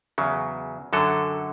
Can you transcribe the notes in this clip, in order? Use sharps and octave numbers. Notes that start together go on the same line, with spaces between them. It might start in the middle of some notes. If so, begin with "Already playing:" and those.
E2 C#3 F#3
F#2 D3 F#3 A4